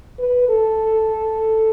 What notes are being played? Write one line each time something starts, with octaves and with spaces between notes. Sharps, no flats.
B4
A4